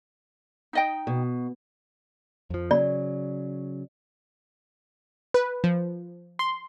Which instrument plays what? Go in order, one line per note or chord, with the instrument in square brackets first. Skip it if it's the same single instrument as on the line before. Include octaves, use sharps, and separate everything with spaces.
[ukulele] D#4 D#5 G5
[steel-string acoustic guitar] B2
[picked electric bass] F2 F3
[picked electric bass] C#3 F#3 [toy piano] D5
[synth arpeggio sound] B4
F3
C6